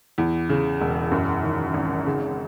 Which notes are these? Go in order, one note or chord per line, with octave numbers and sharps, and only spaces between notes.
E2
C#3
E1
F#2
D#3
G#1
C#3